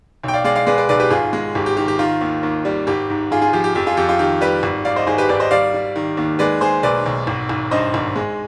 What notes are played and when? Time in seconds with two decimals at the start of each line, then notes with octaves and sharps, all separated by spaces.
0.23 B1 G5
0.34 D5 F5
0.44 G#3 D5 F5
0.56 D5 F5
0.66 G#3 B4 D5
0.78 B4 D5
0.89 B1 B4 D5
1.00 G4 B4
1.10 G#1 F4 G#4
1.33 G#3
1.55 G#1 G4
1.66 G4
1.77 D#3 G4
1.88 G4
1.99 D#3 F4
2.21 D#2
2.43 D#2
2.65 G3
2.87 G#1 G4
3.10 G#2
3.31 G#2 F4 G#4
3.42 F4 G#4
3.53 F3 G4
3.64 G4
3.75 F2 G4
3.86 F4 G#4
3.97 F2 G4
4.09 F4
4.19 D#3 G4
4.41 G3 G4 B4
4.63 G#1
4.85 G#2 D5 F5
4.96 C5 D#5
5.07 G#1 G#4 C5
5.18 G4 B4
5.29 G#1 B4 D5
5.40 C5 D#5
5.51 G3 D5 F5
5.74 G3
5.96 D#3
6.17 D#2
6.39 G#3 B4 D5
6.61 G#3 G#4 C5
6.83 B1 B4 D5
7.06 B1
7.27 G#1
7.49 G#1
7.71 G2 C5 D#5
7.94 G#1
8.16 G#3